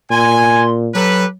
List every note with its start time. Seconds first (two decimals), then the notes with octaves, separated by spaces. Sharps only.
0.10 A#2 G#5 C6
0.94 F#3 G4 A4 B4